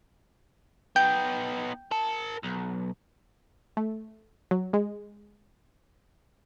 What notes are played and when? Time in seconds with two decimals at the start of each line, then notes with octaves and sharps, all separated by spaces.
0.96 B3 D#4 G5
1.91 A#4 A5
2.44 B1
3.77 A3
4.51 F#3
4.73 G#3